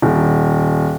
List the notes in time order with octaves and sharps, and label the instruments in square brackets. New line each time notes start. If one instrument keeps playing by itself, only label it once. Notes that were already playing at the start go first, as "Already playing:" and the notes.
[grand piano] D#1